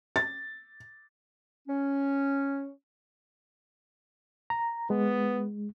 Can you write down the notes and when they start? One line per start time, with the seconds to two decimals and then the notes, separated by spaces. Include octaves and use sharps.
0.16 A6
1.68 C#4
4.50 A#5
4.90 G#3 B3